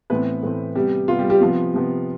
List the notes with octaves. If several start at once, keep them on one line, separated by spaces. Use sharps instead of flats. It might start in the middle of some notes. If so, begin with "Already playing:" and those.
A2 E3 A3 B3 C4 B4
A2 E3 A3 C4
C3 G3 B3 G4
C3 G3 B3 F4
G3 G4
G3 G4
C3 F3 B3 F4
C3 F3 B3